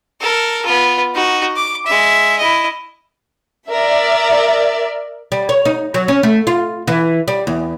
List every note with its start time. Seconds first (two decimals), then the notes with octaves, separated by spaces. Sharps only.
0.21 A4 A#4
0.65 B3 F4
1.15 D#4 F#4
1.56 D6
1.86 G#3 E5
2.38 E4 D#5
3.67 A#4 D5 E5
5.32 G3
5.49 C#5
5.65 D#4
5.94 F#3
6.08 C#4
6.23 A3
6.47 F4
6.88 E3
7.28 G3
7.47 E2